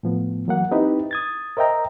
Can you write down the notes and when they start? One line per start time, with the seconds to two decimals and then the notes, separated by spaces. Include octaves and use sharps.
0.03 A2 F3 B3
0.47 E3 F#3 A#3 F#5
0.71 C4 D#4 E4 G4 B4
1.11 D#6 G#6 A6
1.57 A#4 C5 D#5 E5 G5 A#5